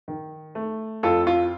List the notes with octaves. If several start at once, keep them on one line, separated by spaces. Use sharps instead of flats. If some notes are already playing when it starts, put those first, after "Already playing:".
D#3
A3
F2 F4 A4
F4